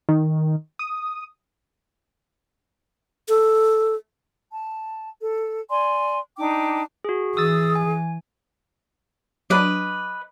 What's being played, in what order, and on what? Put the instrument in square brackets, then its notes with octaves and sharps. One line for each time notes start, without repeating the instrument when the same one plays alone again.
[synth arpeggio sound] D#3
D#6
[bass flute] A4
[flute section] A5
A4
D5 G#5 C6
D4 D#4 G5 D6
[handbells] F#4 G#4
[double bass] E3 [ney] G#4 [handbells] D#6 E6 A6
[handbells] G#5
[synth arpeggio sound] F#3 D4 [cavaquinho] B4 D#5 D6